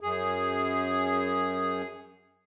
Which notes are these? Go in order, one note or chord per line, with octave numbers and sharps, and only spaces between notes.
F#2 G#4